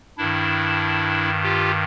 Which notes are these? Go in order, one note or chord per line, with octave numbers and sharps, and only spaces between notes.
G2 D#3 D4 E4
F4 G4